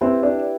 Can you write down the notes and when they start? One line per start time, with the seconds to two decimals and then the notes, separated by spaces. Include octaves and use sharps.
0.01 C4 E4 G4 B4 D5
0.23 D4